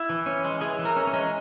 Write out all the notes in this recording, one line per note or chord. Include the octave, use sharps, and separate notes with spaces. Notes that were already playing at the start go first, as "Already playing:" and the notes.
Already playing: E4
E3
C#4
G#3
E3 G#4
E3
A#4
C#4
C#4
G#3